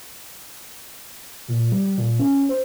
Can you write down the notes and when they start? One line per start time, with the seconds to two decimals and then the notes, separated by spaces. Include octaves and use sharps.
1.48 A#2
1.72 G3
1.98 A#2
2.19 C#4
2.49 C5